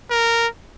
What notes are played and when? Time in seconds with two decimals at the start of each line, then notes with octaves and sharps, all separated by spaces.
0.10 A#4